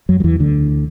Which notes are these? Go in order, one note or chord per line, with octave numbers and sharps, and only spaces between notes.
F#2 F#3
F#3
E2 E3
D2 D3